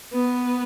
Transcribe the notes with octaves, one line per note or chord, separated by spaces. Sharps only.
B3